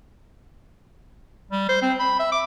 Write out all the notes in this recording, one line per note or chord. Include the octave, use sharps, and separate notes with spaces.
G3
C5
C4
B5
E5
D6